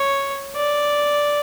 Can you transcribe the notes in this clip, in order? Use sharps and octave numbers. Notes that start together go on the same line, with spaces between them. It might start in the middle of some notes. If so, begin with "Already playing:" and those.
Already playing: C#5
D5